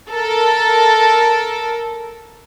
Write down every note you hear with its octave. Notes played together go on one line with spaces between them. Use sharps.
A4 A#4